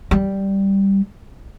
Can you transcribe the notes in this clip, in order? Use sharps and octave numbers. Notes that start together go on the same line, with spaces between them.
G3